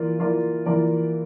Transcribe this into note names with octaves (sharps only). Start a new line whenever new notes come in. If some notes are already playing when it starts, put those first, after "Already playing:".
Already playing: E3 A#3 F4 A#4 D5
E3 A#3 F4 A#4 D5
E3 A#3 F4 A#4 D5